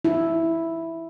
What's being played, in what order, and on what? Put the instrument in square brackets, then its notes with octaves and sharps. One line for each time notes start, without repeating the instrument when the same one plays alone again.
[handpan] E4